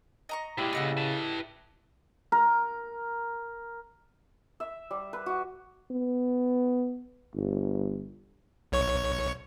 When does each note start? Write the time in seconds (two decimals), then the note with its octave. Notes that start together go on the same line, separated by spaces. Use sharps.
0.29 D#5 A#5 C#6
0.58 A#2 G#3 E4 G4 D5
0.73 C#3 A4 D#5 F#5
0.97 B4 A5
2.32 A#4
4.60 E5
4.91 G3
5.13 B4
5.26 F#4
5.91 B3
7.35 G1
8.72 B1 C#5 C#6